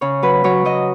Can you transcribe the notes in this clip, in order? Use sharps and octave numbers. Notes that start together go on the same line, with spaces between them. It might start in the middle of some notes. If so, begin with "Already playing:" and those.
C#3 C#5
F#3 B4
F#3 C#5
F#3 D#5